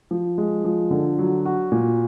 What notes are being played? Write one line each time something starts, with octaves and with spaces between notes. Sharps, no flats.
F3
G#3
F3
D3
F#3
F#4
A#2